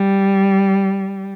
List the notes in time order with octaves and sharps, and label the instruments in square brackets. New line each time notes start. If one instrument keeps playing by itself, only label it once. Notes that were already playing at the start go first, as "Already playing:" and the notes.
Already playing: [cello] G3